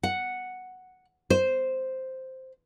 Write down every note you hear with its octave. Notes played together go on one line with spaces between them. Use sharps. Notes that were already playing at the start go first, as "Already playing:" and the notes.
F#5
C5